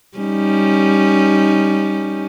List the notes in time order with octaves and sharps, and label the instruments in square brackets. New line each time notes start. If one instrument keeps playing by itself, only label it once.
[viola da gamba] G3 C#4 D#4